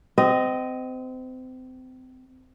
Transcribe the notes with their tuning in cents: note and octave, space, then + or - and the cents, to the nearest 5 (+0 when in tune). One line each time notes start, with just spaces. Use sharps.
C4 -30 D#5 +0